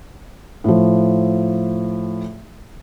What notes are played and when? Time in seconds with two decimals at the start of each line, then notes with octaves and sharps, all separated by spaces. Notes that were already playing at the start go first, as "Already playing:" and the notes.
0.64 A2 F3